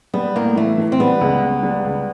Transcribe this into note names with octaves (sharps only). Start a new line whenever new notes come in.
G3 B3
A2 A#3
E3 A3
E3
C4
G3 B3
C#2
C#2
G3
C#2